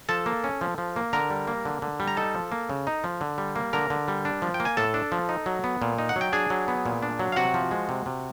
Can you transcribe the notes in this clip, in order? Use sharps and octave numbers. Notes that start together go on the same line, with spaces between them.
F3 A4 A5
A#3
C#4
F3
F3
A#3
D3 A#4 A#5
G3
A#3
D3
D3
G3
A#5
D#4 A4 A5
F3
A#3
C#3
D#4
F3
D3
G3
A#3
D3 A#4 A#5
D3
G3
D4
F3
G5
A#3
G#5
A2 A4 A5
D4
F3
D#4
F#3
B3
A#2
D#4
F#5
F#3
G5
D4 G#4 G#5
F#3
B3
A#2
D4
F#3
F5
C3 F#4 F#5
F3
G#3
C3
C3